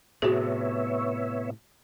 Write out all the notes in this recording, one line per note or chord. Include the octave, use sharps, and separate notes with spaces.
A2 C3 B3 F#4 G#4 C#5 E5